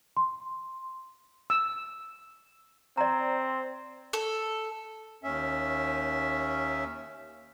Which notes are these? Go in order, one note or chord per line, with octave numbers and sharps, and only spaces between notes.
C6
E6
C4 D5 A#5
A4
D#2 C#4 E5